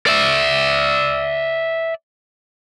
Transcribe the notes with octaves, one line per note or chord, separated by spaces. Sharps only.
D5 E5